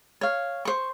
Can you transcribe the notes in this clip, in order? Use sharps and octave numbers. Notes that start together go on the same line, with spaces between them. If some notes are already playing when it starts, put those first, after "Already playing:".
C#5 F5
C5 C#6